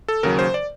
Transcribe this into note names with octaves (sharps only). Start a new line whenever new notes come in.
A4
D#2 C#3 F#3 A#4
C5
D5